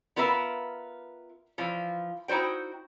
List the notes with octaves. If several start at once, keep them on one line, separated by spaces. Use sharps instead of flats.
B3 F4 A#4 B4 E5
E3 F3 F4
D#4 E4 F#4 C5 G5